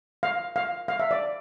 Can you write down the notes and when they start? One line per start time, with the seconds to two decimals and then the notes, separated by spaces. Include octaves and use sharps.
0.23 F5
0.56 F5
0.88 F5
1.00 E5
1.11 D5